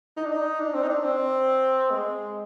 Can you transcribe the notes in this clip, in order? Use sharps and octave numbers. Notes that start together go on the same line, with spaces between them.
D#4
D4
D#4
D4
C4
D#4
D4
C4
G#3